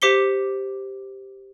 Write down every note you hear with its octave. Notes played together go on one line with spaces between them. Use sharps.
G4 C5 D6 B6 C#7 G7